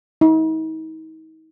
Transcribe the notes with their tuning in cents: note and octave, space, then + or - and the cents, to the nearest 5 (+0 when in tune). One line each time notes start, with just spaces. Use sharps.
D#4 +40